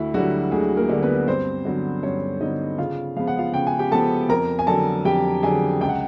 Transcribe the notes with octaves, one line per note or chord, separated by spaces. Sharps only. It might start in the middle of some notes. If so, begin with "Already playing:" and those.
Already playing: D2 E4
D3 F#3 G3 F#4
D2 G#3 G#4
A#3 A#4
D3 G3
B3 B4
G2 C4 C5
D3 F#3 B3
G2 C#4 C#5
D3 F#3 B3 D#4 D#5
C#3 F4 F5
F3 G#3 B3 F5
F#5
F4 F5
C#3 G5
G#5
G4 G5
F3 G#3 B3 A4 A5
F2 A#4 A#5
G#5
D3 F#3 A4 A5
F2 G4 G5
D3 F#3 G#4 G#5
C#2 G5
F#5